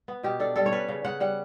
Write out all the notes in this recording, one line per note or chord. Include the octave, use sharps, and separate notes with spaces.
B3
B2 G4
D4 A4
G3 A4
C#5
C#4 B4
C#3
C#3 F#5
G3 F#5